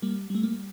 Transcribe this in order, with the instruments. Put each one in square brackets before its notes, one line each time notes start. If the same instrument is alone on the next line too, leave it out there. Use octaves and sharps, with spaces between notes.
[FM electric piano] G3 A#3
G3 A3
A#3